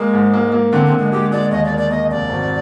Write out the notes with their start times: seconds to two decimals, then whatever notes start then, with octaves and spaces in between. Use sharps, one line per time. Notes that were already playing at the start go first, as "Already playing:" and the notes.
Already playing: G#3 A#3
0.13 G#2
0.34 A#3
0.52 A#3
0.72 D3 C4
0.85 C4
0.92 D3
0.99 G#3
1.12 G#3 G4
1.31 G#3 D5
1.51 D#2 D#5
1.64 D5
1.70 A#3
1.77 D5
1.90 A#3 D#5
2.10 F1 D5
2.29 G#1